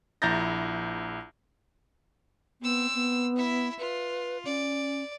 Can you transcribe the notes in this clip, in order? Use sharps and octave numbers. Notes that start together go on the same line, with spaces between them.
A#1 E4 A#5 G6 A6 A#6
B3 C4 E6
B3
E4 E5
F4 B4
C#4 D5